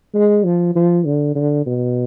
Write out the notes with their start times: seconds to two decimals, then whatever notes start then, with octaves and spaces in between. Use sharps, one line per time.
0.14 G#3
0.44 F3
0.75 F3
1.06 D3
1.35 D3
1.66 B2